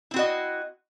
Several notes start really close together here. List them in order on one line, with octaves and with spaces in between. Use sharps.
E4 C4 F#4 D#5